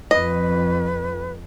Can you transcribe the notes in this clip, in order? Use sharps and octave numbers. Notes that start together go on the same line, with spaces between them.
F2 B4 D#5